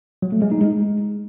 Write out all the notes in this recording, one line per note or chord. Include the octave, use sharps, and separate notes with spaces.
F#3
A3
G#3
D#4
G#3